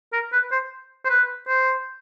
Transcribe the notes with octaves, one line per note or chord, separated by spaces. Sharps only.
A#4
B4
C5
C5
B4
C5